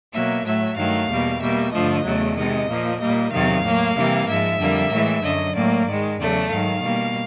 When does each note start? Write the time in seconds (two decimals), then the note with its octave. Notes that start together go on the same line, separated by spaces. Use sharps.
0.12 B2 F#3 A#3 E5
0.44 A2 F#3 A3 E5
0.76 G2 D#3 F#3 A3 F5
1.08 E2 B2 G3 A#3
1.40 B2 G3 A#3 E5
1.72 G2 D3 F3 A3 D#5
2.04 E2 C#3 F#3 A3
2.35 C3 D#3 G#3 D#5
2.68 A#2 F3 A#3
2.99 A#2 G3 A#3 D#5
3.31 E2 C3 D#3 F#3 F5
3.63 A2 F#3 A#3
3.95 C3 E3 G3 A#3
4.27 G#2 F3 G#3 E5
4.58 F2 D3 G3 A#3
4.90 A2 E3 G#3
5.22 F#2 D3 F#3 D#5
5.54 A2 F#3 A#3 D5
5.85 G#2 D#3 G#3
6.18 E2 C#3 F#3 A3 D5
6.49 G#2 D#3 F#3 F5
6.81 B2 G3 A#3